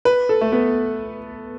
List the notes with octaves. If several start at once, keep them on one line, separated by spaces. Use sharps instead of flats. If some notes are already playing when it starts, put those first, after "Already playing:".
B4
A4
A3
B3